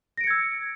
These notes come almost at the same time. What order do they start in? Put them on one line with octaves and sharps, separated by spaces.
A#6 D7 C#7 G#6 E6